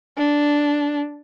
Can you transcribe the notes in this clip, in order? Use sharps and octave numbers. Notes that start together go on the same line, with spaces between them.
D4